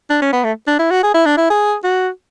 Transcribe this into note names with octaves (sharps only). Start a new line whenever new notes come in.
D4
C#4
B3
A3
D4
E4
F#4
G#4
E4
D4
E4
G#4
F#4